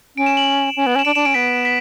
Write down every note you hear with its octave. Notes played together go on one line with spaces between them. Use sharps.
C#4 D7
E7
F#7
C#4
B3
C#4 E7
D4 D7
D4 E7
C#4 D7
B3 B6
B6